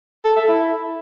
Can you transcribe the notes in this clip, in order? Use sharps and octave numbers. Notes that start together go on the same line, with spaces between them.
A4
E5
E4